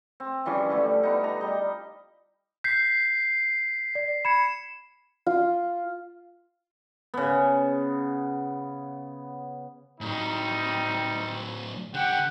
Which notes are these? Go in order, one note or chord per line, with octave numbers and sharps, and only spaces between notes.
C4
E3 F3 G3 C#4
D3 G3 A3
B3 D#4
A#5
G3 D#5
G6 B6 C7
D5
B5 G#6 C#7 E7
F4
C#3 B3
A2 F#3 G3 C4 D#4
D3 G4 F#5 G5